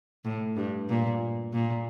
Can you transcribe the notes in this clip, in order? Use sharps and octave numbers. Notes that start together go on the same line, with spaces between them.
A2
G2
A#2
A#2